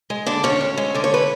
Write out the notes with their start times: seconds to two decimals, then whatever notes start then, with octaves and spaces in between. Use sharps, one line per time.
0.10 G#3
0.26 D3 D4 D5
0.43 D2 C#4 C#5
0.61 D2
0.77 G#3
0.95 D3 D5
1.04 C#5
1.14 B4